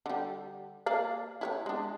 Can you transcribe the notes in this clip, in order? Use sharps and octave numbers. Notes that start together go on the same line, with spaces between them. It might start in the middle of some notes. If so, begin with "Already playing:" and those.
D3 G3
A#3 D5 F5
E4 A#4 C#5
G#3 D4